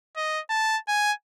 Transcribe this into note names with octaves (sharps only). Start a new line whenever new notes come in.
D#5
A5
G#5